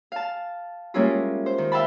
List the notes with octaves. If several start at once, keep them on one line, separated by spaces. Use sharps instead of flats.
F5 A5
G3 G#3 A#3 C#4 E4 F4
C5
D#3
E5 F5 G5 A5 B5